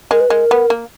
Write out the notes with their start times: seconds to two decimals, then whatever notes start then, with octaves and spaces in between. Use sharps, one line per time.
0.11 G#3 A#4
0.21 B4
0.29 G#3 A#4
0.51 B3
0.70 A#3